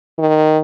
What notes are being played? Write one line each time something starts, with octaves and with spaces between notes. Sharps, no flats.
D#3